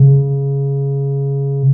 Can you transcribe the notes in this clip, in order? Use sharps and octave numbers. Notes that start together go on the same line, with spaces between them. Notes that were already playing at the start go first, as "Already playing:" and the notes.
Already playing: C#3